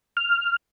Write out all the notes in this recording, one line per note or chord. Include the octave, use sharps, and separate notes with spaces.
F6